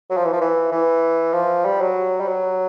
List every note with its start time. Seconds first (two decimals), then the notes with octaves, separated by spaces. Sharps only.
0.10 F#3
0.17 F3
0.25 E3
0.33 F3
0.41 E3
0.72 E3
1.33 F3
1.65 G3
1.81 F#3
2.20 G3
2.28 F#3